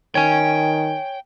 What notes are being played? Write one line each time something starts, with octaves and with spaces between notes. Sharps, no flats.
D#3 C#5 G5 G#5